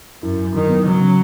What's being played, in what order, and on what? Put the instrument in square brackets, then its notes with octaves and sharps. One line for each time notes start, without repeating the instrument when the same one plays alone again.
[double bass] F#2 [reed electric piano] E4
[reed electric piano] G#2
[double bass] D#3 [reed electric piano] F#3
[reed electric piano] B3
[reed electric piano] C#3 [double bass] F#3
[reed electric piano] C#3